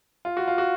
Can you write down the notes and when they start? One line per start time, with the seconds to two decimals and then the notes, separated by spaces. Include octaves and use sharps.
0.25 F4
0.37 F#4
0.48 F4
0.58 F#4